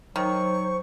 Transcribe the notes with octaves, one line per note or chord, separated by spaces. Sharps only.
D#3 F#3 C5 C#6